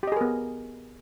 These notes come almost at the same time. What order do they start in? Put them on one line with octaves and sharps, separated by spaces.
G4 D#5 G#4 A#4 B3